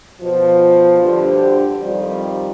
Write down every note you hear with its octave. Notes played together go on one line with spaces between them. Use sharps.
B2 F3
D2 G2 D3 D4 G4 C5
F2 D#3 F3 G3